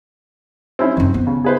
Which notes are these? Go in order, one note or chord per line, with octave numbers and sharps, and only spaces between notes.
C4 C#4 E4
F#2 D#3 C4
B3
C#3
G#4 B4 C5